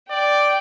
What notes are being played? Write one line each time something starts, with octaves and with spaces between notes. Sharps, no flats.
D5 G5